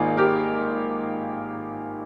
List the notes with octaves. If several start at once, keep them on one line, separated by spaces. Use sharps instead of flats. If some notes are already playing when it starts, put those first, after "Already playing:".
Already playing: G#1 G#2 D#3 A#3 F4 G#4
G4 A#4